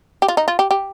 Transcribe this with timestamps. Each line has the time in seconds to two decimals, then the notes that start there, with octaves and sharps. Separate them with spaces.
0.22 G4
0.28 F4
0.37 D#4
0.48 F4
0.59 G4
0.71 G4